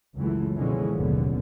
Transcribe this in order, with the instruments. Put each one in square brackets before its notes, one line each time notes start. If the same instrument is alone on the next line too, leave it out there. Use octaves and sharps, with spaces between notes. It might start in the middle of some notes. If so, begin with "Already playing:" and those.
[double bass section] C#2 F#2 E3 A3
B2 D3 E3 F3 G#3 C#4
F#1 D#2 B2 D3 B3